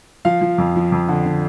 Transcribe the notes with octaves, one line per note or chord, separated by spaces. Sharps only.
F3 F5
F3
F2
F3
F2
D3
D3